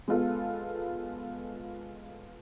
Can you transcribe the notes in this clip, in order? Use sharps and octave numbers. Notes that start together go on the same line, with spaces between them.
G#3 B3 F4 A4